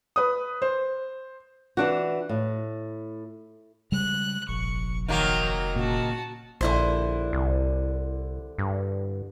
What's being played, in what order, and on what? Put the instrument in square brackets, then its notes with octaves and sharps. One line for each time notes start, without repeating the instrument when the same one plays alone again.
[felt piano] B4 D#6
C5
[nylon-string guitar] E3 D4 F#4
A2
[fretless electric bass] C#3 G3 G#3 [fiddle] F#6
[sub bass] F1 [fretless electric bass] A#1 [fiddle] C#6
[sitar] D#3 F#3 A#3 [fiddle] F#4 A#4
[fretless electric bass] A#2 C#3 [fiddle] F#4 A5
[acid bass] A#1 [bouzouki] D3 E4 C5
[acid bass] C2
G2